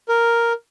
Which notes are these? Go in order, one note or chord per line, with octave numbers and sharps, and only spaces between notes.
A#4